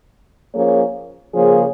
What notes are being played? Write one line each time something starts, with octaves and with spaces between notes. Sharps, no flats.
F3 A#3 C#4 G#4 C#5
C#3 F3 A#3 C#4 G#4